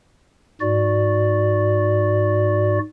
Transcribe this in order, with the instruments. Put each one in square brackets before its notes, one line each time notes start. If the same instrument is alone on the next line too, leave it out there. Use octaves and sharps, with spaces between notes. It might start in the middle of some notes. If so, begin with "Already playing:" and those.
[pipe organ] G#2 F#4 D5